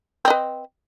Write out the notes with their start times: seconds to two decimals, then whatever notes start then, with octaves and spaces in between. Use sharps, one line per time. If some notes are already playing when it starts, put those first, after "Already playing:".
0.25 C4
0.28 D#5
0.30 B4